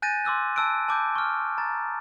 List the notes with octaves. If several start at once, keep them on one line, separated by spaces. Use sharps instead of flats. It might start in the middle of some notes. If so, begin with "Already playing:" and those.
G#5 F#6 G6 A6 A#6 D#7
C6 D6 E6 F#6
A5 E6 F#6 D7
A5 D6 G6
C#6 F6
A#5 A6